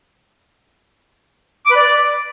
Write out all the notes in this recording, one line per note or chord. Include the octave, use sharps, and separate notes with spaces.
D6
B4
D5